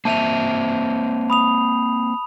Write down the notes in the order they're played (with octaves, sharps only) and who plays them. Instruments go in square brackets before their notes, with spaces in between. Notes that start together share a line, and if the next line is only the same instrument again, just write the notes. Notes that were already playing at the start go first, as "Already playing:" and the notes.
[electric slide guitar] A#3 C4 E5 [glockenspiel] A5 D#7 F7
[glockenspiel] B5 D#6 F7